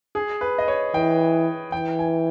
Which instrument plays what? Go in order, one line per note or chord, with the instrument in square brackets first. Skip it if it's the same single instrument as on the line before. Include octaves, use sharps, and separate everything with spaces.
[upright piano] G#4
B4
D#5
C#5
[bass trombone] E3 [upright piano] G5
[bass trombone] E3 [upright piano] G5
[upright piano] G#5